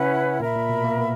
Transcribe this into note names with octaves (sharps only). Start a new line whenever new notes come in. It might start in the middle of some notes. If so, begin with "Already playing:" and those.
Already playing: C#3 C#4 E4 B4 F#5
A#2 A#4 E5 B5
A#2
B2
A#3
B3